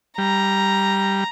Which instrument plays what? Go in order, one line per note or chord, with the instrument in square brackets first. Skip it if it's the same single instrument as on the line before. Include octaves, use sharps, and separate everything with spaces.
[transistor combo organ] G3 [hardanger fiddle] A#5